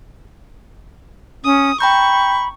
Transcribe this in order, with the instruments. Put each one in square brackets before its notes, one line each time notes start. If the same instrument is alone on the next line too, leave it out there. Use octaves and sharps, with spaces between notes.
[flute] C#4 [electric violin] D#6
[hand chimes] G5 A#5 G6 [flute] B5 [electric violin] C#6